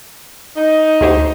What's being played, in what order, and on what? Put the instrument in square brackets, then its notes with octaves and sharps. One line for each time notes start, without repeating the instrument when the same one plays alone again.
[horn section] D#4
[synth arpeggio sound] D2 G4 C5